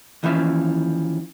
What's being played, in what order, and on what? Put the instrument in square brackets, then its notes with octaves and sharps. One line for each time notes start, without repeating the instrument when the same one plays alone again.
[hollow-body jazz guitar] D#2 E3 F3 C#4 E5